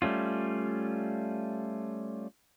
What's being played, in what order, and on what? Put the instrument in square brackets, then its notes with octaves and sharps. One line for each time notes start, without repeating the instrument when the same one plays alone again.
[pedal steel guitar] G3 A3 C#4 F4